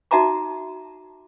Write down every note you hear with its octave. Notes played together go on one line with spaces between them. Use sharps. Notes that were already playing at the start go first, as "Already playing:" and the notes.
D#4 F#4 E5 A5 A#5 D6